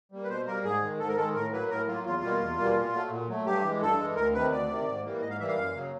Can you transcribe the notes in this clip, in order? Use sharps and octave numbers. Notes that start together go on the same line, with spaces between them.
G3 A#3
B4
B2 C5
G3 A#3 A#4
G#2 G#4
D#3 G#3
G#2 A4
A#4
D#3 G#3 A4
A2 A#4
F#3 A#3 B4
A2 A#4
F#3 A#3 F4
E2 F4
B2 G3 A#3
E2
B2 G3 A#3
A#2
F#3 A3
A#2
F#3 A3
G2 G4
E3 G#3
G2 A4
E3 G#3
D2 A#4
C3 D#3 B4
D2 D5
C3 D#3
G#2
E3 G3 A#3
G#2 D#5
F5
E3 G3 A#3 E5
F5
F#2
C#3 F#3 A#3